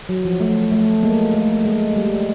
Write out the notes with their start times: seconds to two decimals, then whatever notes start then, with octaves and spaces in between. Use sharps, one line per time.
0.09 F#3
0.25 F3
0.40 A3
0.72 A3
1.03 G#3 A#3
1.34 A3
1.65 G#3
1.96 G3